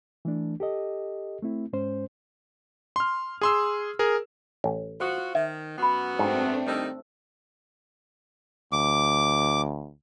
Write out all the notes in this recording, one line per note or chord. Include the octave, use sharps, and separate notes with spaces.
E3 A3 D4
G4 A4 D#5
A3 C4 E4
G#2 G#3 C#4 C5
C6 F6
G#4 C6 E6
G#4 A#4
A1
F4 F#4 C5 D#6
D#3 E5
F#2 B3 F#4 F#5 B5
G#2 A3 C4 D4 G5
D#3 G3 D#4 C5 E6
D2 D6